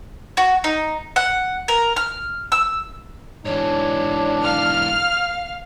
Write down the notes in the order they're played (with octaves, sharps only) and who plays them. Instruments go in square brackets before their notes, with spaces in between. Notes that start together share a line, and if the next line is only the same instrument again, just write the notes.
[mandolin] F#4
D#4
F#5
A#4
F6
E6
[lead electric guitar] G#2 E3 [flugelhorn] D4 [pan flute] C#5
[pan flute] F5 [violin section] F6